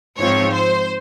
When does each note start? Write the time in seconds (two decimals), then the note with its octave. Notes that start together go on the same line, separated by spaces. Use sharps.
0.18 G#2 F3 C4 C#5
0.54 C5